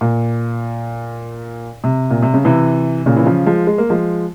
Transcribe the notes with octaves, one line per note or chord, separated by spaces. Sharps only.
A#2
C3
A#2
C3
C#3
C3 E3
A#2 C#3
E3
C#3 F3
F3 G#3
G#3
A#3
F3 G#3